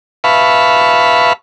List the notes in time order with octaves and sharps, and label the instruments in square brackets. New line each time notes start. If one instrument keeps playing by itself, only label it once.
[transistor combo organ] B4 E5 F5 A5 B5 C#6